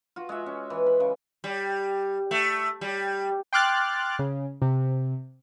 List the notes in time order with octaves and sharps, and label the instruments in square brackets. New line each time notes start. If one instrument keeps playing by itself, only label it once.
[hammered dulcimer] F4 F#4
G#3 F#4 E5
C#4
E3
B5
C#3
[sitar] G3
A3
G3
[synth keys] G5 C6 D6 F6 F#6 A6
C#3
C3